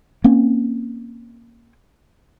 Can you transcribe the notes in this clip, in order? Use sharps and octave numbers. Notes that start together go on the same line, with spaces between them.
A#3 C4 C#4